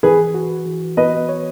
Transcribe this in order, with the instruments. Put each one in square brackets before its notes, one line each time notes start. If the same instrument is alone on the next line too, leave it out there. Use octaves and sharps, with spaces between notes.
[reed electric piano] E3 [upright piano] G#4 B4
[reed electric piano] F#4
E3
[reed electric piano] B3 [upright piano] B4 D#5
[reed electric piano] C#5